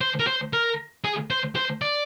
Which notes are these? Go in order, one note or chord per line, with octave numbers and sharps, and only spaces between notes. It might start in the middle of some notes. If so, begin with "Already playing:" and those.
C5
A#4
C5
A#4
G#4
C5
C5
D5